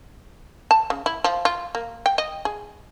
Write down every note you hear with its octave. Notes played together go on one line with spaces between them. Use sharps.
A5
C#3
E4
F3
F4
A#3
G5
D#5
G#4